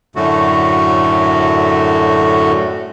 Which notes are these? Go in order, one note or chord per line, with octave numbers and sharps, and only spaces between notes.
F#2 A2 D3 A3 F#4